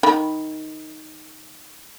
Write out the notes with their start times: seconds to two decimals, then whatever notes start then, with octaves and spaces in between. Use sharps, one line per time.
0.03 D#3 B5